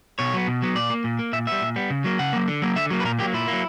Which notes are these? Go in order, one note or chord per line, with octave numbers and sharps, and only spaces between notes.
B2 C#5
F#3 B3
B2
F#3 B3
A#2 D5
A#3
A#2
A#3
A#2 E5
G3 B3 E5
A#2
G3 B3
C#3
F#3 A#3
C#3 F#5
F#3 A#3
D3
F#3 A#3
D3 E5
F#3 A#3
B4
A#2 A#4
F#3 A#3 G4
A#2 E4
A#3
F#3